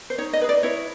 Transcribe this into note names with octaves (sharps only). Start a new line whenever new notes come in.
C5
D#4 C#5
D#5
G#4 B4
D5
E4 C#5